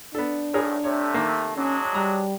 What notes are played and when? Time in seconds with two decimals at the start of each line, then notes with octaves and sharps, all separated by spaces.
0.15 B3 D4 A4
0.54 B1 A2 G#4 A#4 C#5
0.84 C3 A3 C#5
1.14 D#3 A#3
1.56 F#3 G#3 C#4 D4
1.94 G3 A#5